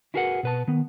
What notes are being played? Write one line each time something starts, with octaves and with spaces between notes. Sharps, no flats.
E4 F#4 G#4 A#4 B4 F#5
B2 B4 A5
D#3 B3